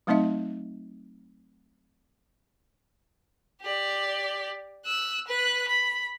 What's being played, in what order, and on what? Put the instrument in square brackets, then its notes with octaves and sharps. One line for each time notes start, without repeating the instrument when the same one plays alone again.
[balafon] F#3 A3 C4 D#4 D#5 E5
[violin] G4 D5
E6 F#6
B4 F#6
B5